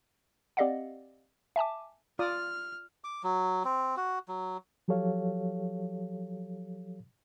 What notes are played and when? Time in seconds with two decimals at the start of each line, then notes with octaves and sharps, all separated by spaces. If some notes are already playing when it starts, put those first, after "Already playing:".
0.57 C4 G4 D5 D#5 F5 F#5
1.56 E5 G#5 A5 D6
2.19 F4 D5 D#6 F6
3.04 D6
3.23 F#3
3.65 C4
3.97 F#4
4.28 F#3
4.88 F3 F#3 G4 A4 C#5 F5